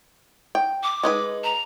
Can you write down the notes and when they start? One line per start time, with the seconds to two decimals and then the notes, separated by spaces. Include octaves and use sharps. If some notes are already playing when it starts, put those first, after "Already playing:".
0.55 G5
0.83 D6
1.03 G#3 D#4 B4
1.44 A#5